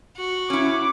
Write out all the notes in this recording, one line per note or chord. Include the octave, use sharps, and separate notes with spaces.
F#4
C#4 E4 D6